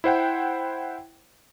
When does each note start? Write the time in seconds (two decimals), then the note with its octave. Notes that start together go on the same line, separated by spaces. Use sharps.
0.04 E4 C5 F#5 G5